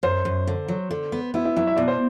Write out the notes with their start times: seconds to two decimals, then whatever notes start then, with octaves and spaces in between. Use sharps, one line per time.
0.03 F#2 C5
0.25 F#2
0.47 D3
0.68 F#3
0.91 D3
1.12 B3
1.34 B3 E4
1.45 E4
1.57 F#3 E4
1.67 E5
1.76 B2 D5
1.88 C5